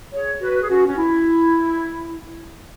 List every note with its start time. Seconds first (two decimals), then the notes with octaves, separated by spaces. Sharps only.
0.12 G#4 C#5
0.40 F#4 B4
0.62 G#4
0.69 C#4 F#4
0.86 C#4
0.97 E4